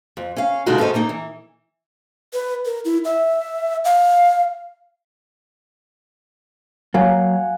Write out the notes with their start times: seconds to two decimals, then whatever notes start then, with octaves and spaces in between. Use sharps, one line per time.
0.17 F2
0.37 C#4 F5
0.66 B2 D3 G#3 D#4 F4 F#4
0.78 G#2 C#4 A4 B4 C5 D#5
0.94 A#2 A#3 D#4
1.09 E3
2.33 B4
2.66 A#4
2.85 E4
3.05 E5
3.85 F5
6.94 F#3 A#3 F5 F#5 G#5